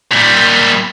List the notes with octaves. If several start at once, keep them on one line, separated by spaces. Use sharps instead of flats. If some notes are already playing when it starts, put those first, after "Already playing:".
A#2 G3